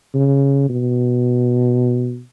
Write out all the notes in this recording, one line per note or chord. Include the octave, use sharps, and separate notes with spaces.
C#3
B2